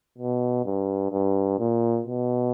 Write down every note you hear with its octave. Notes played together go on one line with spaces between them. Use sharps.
B2
G2
G2
A#2
B2